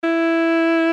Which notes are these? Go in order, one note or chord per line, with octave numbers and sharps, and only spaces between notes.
E4